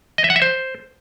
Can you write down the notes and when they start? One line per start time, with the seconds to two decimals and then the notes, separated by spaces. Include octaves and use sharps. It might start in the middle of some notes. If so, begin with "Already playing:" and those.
0.18 D#5
0.24 E5
0.30 F#5
0.36 E5
0.42 C5